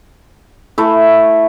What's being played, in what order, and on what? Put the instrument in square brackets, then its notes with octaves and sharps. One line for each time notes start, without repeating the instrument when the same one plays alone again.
[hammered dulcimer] A3 E4